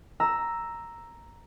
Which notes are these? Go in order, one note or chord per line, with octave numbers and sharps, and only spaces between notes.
A#5 E6